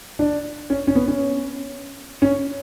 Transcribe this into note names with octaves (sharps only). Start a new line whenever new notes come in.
D4
C#4
C#4
B3
C#4
C#4